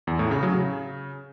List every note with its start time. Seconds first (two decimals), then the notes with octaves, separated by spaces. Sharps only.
0.07 E2
0.19 A2
0.31 C#3
0.43 F#3
0.54 C#3